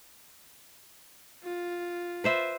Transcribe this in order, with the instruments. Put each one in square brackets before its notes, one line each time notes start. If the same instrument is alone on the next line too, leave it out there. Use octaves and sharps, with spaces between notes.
[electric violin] F4
[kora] B4 C5 E5